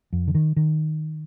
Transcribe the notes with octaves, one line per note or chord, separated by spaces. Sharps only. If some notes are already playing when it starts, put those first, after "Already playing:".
F2
D3
D#3
D#3